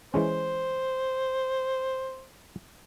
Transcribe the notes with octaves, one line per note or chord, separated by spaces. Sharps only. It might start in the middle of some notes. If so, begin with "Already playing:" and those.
E3 G#3 C#4 C5